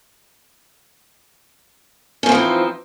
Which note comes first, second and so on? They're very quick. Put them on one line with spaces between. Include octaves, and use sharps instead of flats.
C#4 F3 C4 E3 D#4